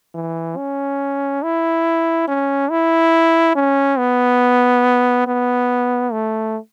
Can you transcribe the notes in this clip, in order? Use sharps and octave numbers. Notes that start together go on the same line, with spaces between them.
E3
C#4
E4
C#4
E4
C#4
B3
B3
A3